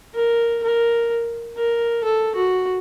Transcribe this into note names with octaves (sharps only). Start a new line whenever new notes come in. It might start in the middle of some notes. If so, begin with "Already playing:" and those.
A#4
A#4
A#4
A4
F#4